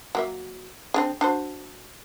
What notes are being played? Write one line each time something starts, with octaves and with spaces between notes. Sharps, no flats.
F#3 A#3 E5
C4 D4 G#4
D4 F#4 C5